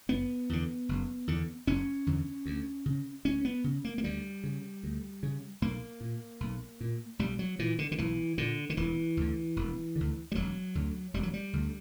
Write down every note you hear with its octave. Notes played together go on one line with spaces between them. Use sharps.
F#1 B3
E2 D3
F#1
E2 D3
F#1 C#4
E2 D3
D2
C#3
D2 C#4
B3
C#3
A#3
A#3
D2 G3
C#3
D2
C#3
B1 A#3
A#2
B1
A#2
B1 G3
F#3
A#2 E3
D3
D3
B1 E3
A#2 D3
D3
E1 E3
D2 D3
E1
D2 D3
G3
E1 F#3
D2 D3
E1 G3
F#3
G3
D2 D3